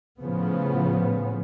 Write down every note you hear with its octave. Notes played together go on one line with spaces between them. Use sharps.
A2 C#3 F3 B3